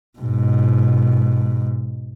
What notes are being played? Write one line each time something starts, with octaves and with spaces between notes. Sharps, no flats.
G#2 B2